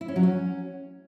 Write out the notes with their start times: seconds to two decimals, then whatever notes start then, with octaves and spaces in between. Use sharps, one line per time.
0.01 E4
0.08 C#4
0.16 F#3
0.23 C#4